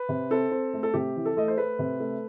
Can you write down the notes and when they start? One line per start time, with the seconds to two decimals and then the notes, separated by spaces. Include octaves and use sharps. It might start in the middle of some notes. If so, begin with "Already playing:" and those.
Already playing: B4
0.09 C3
0.30 C4 A4
0.51 C4
0.74 A3
0.83 A4
0.94 C3 G4
1.16 E3
1.25 A4
1.37 A3 D#5
1.48 C5
1.58 A3 B4
1.79 C3
2.00 A3